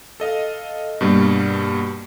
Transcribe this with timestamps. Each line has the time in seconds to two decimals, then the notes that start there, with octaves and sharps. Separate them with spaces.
0.20 A4 D#5 F5
1.01 G2 B2 G3 A#3